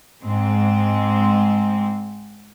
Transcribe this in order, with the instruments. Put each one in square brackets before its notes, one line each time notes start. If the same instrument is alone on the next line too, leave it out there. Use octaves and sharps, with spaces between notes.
[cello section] G#2 G#3 C4